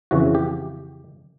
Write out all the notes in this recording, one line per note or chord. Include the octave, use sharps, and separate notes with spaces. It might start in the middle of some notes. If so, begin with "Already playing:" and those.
F2 C#3 E3 F#4
G4